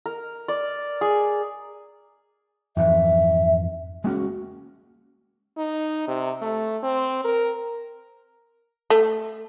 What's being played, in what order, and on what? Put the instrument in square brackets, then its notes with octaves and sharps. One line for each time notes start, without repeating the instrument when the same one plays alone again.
[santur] A#4
D5
G#4
[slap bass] F2 G#2 E3 [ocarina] E5
[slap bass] G#3 A#3 C#4 [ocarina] F#4
[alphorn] D#4
C3
A3
C4
A#4
[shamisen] A3